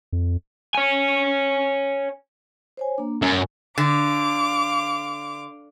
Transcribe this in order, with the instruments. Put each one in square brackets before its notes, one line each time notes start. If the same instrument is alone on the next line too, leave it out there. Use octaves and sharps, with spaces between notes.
[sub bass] F2
[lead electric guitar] C#5 G#5
[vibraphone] C5 C#5 G#5
A#3 D4
[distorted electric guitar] F#2 [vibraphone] G#5
[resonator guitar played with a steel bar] D3 [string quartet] F5 D6